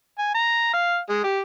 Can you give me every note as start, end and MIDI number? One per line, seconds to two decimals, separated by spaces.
0.19 0.31 80
0.35 0.70 82
0.74 0.98 77
1.10 1.24 56
1.24 1.40 67